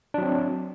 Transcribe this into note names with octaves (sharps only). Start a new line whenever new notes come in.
F#3 C4 D4